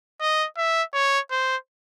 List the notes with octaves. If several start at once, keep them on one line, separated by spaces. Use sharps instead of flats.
D#5
E5
C#5
C5